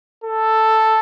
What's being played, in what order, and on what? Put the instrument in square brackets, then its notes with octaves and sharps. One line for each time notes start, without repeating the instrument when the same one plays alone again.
[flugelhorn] A4